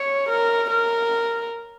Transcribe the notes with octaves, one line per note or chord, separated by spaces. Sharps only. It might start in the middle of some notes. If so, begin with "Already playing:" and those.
Already playing: C#5
A#4
A#4